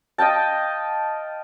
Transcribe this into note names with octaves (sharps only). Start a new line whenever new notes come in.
D#5 F5 G5 A5